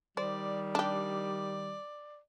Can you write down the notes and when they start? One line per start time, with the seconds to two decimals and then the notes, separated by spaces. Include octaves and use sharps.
0.17 D#3 G3 C5 D5
0.75 D4 G4 D5